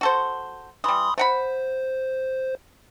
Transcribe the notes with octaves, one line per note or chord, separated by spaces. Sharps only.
F#4 A4 C5
E3 G3 B5 C6 D#6
A3 C5 F#5 B5